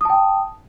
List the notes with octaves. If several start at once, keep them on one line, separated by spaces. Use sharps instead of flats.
G5 A5 D#6